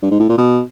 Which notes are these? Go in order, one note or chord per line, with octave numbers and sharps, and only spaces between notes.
G2
G#2
A2
A#2
B2